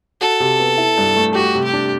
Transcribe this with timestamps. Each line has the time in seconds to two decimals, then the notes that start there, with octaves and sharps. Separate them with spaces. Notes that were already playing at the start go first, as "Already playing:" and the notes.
0.21 F#4 A4
0.40 C3
0.59 B3
0.78 E4
0.97 G2
1.16 A3
1.35 F#4 G4
1.55 C3
1.64 G4
1.73 D4